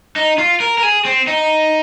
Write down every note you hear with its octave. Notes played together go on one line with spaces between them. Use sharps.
D#4
F4
A#4
A#4
G#4
C4
D#4